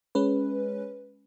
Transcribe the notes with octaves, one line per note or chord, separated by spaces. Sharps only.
G#3 C#4 B4